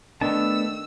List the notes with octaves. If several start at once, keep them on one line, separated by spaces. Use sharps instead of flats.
D#3 A3 B3 D4 A5 E6